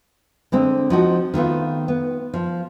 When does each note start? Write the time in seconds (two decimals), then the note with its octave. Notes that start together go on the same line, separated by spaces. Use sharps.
0.52 D3 G#3 C4
0.90 F3 D#4 F#4
1.34 D#3 A3 B3 F4
1.88 B3
2.34 F3